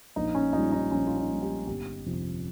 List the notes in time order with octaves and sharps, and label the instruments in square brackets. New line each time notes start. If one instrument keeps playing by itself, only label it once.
[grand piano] A#1 D#4
C#4
A#2 G3 D#4
D#4
A#1 C#4
F4
D#4
A#2 G3
G4
G1 G4
F2 C3 F3